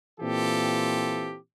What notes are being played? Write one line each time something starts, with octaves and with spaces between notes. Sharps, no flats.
A#2 E3 C4 F4 G4 A4